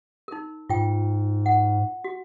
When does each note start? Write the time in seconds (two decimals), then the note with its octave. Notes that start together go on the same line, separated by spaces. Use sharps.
0.28 D#4 A#4
0.69 G#2 F4 G5
1.46 F#5
2.04 F#4